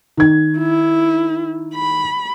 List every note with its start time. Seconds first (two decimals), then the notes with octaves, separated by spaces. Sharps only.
0.17 D#3 G#6
0.59 E4
1.75 B5